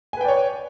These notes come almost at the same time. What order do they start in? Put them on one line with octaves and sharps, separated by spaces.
G#5 B4 G5 D5 C#5